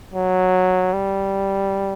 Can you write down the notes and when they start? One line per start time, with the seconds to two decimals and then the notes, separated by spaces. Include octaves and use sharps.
0.14 F#3
0.93 G3